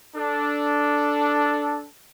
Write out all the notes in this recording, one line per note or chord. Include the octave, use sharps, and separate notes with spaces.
D4 A4